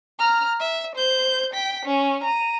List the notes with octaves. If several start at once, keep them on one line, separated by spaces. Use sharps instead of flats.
A#5 F6
E5
C5 G6
G5 B6
C#4
A#5 D#7